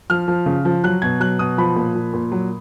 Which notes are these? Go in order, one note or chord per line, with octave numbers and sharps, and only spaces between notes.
F3 F6
F3
C#3
F3
F#3 F#6
B2 G#6
F#3 F#6
B2 D#6
F3 B5
A#2
F3
A#2
F#3